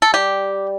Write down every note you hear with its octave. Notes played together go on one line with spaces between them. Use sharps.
A4
G3 G4